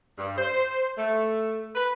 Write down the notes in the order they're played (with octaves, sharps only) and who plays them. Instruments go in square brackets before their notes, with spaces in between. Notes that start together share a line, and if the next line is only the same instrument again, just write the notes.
[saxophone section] G2
C5
A3
B4